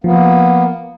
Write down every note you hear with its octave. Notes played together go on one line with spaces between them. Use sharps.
F3 A#3 B3